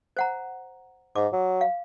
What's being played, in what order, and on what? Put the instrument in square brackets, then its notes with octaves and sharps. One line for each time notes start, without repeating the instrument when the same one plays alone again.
[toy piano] C5 F#5 A#5
[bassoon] G#2 [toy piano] D6
[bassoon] F#3
[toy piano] F5